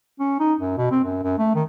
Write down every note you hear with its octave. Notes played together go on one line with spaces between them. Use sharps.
C#4
D#4
F#2
B2
C4
F#2
F#2
A3
D#3